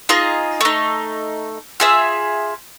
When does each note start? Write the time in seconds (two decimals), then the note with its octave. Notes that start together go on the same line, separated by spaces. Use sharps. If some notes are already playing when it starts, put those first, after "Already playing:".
0.09 D#4 F4 G#4 D#5
0.61 A3 D#4
1.80 F4 G#4 E5